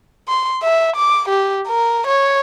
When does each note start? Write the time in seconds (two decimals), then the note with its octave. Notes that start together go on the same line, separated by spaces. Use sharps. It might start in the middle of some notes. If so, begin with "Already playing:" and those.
0.28 C6
0.63 E5
0.96 D6
1.28 G4
1.67 A#4
2.07 C#5